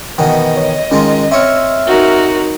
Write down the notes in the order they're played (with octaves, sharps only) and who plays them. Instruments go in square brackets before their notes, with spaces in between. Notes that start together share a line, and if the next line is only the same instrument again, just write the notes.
[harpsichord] B2 D#3 E3 [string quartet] D#5 [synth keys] F#5 G5
[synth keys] C#5
[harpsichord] D#3 G#3 F4 [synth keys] C#4
[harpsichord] C4 C#5 [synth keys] E5 E6 F6
[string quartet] D#4 F#4 A#4